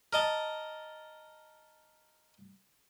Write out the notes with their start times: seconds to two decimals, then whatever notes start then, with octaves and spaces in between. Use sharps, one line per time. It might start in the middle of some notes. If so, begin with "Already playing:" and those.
0.13 A#4 D#5 A5